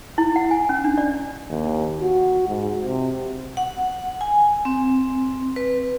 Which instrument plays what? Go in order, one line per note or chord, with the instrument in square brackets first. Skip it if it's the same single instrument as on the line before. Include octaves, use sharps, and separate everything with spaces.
[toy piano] E4
F#5
G#5
C#4
D4
D5
[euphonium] D#2
F#4
G#2
C3
[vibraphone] F#5
G#5
C4
B4